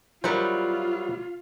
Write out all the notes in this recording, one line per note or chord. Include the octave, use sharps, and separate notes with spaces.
F#3 G3 E4 F4 A#4 C5